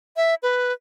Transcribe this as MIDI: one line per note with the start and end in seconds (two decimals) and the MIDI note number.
0.17 0.35 76
0.43 0.72 71